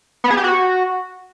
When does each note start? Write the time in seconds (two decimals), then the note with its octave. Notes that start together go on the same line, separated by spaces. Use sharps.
0.24 B3
0.31 G#4
0.37 G4
0.44 F#4